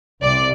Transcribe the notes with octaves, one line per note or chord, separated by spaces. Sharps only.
C2 C3 D5